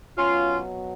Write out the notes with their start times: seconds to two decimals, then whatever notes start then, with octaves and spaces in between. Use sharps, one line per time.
0.17 B2 F#3 C#4 F4